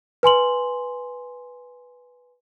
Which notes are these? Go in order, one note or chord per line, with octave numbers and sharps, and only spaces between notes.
B4 G#5 C6 F#7